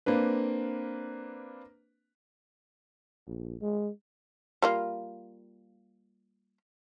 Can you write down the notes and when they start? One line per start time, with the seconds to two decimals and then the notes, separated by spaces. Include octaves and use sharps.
0.06 A#3 C4 D4 B4
3.27 A#1
3.61 G#3
4.62 G3 A#3 F4